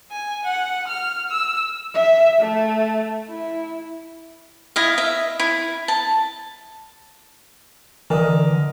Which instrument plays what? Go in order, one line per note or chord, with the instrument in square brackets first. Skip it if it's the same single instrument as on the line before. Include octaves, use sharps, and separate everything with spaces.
[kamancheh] G#5
F#5
F6
E6
[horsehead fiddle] E5
A3
E4
[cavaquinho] E4 D#5 F5
E5
E4
A5
[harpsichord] D3 [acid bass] E3 [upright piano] A#4 D#5